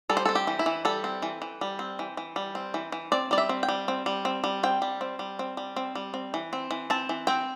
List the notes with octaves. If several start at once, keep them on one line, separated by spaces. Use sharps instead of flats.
G3 A4
C5
C4 A4
G4
E3
E4
E3
G3 A4
C4
E3
E3
G3
C4
E3
E3
G3
C4
E3
E3
C4 D5
G3 D5
E5
C4
G5
G3
C4
G3
C4
G3
C4 G5
G3
C4
G3
C4
G3
C4
G3
C4
E3
C4
E3
C4 A5
E3
C4 G5